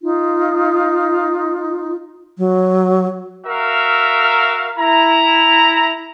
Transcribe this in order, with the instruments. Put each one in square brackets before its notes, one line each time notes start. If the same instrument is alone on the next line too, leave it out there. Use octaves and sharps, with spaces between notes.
[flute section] D#4 F4
[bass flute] F#3
[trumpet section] F#4 A#4 E5 F5
E4 A#5